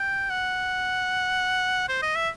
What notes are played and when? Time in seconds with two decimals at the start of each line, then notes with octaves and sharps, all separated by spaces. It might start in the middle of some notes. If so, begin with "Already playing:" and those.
Already playing: G5
0.30 F#5
1.89 C5
2.03 D#5
2.16 E5